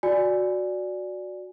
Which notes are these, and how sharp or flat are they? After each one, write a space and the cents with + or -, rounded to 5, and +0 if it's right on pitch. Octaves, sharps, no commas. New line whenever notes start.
F#4 -10 D5 +0 G#5 +0